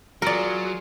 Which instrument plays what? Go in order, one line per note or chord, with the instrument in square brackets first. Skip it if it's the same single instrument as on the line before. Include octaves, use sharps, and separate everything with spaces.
[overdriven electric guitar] F#3 [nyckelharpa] F4 G#4 [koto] A#4 D5